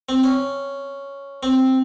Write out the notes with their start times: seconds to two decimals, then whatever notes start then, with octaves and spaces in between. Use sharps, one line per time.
0.09 C4
0.24 C#4
1.43 C4